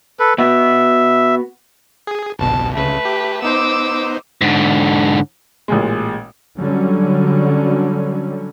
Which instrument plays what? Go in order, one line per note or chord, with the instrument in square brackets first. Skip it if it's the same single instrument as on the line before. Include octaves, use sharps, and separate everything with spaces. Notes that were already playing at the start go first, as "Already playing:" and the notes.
[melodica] A4 B4
[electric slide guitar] B3 F#4 [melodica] E5
[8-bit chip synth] G#4
[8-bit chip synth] G1 C2 B2 [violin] A5
[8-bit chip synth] C#2 C#3 [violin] A3 B4
[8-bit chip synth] G4
[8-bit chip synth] B3 D#4 C5 [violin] D6 E6
[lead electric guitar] G#2 D3
[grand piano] A1 A#2 G#3
[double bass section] D3 F#3 G3 C#4